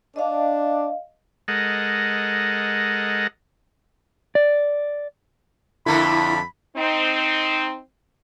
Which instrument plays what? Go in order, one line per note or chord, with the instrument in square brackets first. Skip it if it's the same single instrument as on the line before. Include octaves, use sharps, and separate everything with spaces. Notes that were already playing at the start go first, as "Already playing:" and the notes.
[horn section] D4 [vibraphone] D#5 F5
[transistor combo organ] G#3 A4 A#4 D#5 F#5
[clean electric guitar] D5
[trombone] F2 [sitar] D3 A3 A#3 [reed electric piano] E4 [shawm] B5
[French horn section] C4 D#4